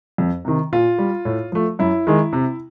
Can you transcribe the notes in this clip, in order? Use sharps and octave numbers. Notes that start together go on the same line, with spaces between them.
F2
C3 D#3
A#2 F4
G3
A2
F3 A3
F#2 E4
D#3 G#3
C3